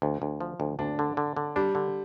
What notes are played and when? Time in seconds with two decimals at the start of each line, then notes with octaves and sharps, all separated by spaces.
0.02 D2
0.22 D2
0.41 F3
0.60 D2
0.79 D2 D4
0.99 D3
1.17 D3
1.37 D3
1.56 G3 D4
1.75 D3